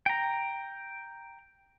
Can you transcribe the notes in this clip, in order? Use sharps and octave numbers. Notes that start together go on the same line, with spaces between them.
G5 A#5